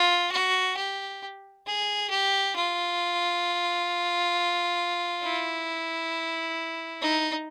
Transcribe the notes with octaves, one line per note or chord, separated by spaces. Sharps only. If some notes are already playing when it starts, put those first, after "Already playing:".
Already playing: F4
F#4
G4
G#4
G4
F4
E4
D#4